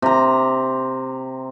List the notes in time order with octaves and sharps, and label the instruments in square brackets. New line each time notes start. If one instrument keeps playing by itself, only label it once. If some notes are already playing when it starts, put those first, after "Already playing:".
[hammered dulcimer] C3 A#5